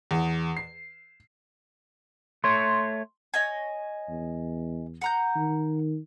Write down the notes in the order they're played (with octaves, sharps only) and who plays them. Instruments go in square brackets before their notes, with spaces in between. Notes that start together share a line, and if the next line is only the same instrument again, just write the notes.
[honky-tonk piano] E2
C7
[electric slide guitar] A3 C#5 [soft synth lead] C6
[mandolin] C#5 D#5 G#5
[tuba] E2
[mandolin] F#5 A#5 G6
[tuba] D#3